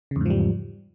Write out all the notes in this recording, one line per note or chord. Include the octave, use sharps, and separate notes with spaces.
E2 G#2 C#3 F3 G3